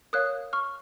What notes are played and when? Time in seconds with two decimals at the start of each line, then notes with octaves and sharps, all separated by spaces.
0.13 A#4 C#5 F5 D#6 F#6
0.53 C#6 F6